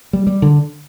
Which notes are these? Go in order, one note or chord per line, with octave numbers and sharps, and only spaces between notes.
G3
G3
D3